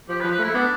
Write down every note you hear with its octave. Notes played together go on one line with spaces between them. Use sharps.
F3 G4
B4
F3
B4
A3
E4
A3
B3 D4